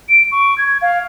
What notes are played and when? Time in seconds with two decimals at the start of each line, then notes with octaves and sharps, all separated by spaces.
0.09 D7
0.32 C#6
0.58 G#6
0.81 F5